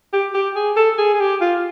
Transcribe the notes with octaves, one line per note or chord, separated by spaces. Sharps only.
G4
G4
G#4
A4
G#4
G#4
G4
F4